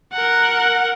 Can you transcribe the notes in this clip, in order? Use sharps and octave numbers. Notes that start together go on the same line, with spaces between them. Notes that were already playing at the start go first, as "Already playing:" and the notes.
A#4 F#5